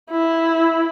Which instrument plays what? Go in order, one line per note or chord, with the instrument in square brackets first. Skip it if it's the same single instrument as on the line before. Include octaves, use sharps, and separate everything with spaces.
[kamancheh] E4